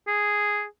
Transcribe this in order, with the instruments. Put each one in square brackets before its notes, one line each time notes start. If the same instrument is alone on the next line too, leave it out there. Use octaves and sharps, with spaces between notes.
[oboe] G#4